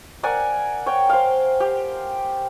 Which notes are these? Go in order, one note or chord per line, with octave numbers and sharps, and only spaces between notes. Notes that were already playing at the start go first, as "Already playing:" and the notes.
A#4 D5 F#5 G#5
C#5 G5
C5 F5
G4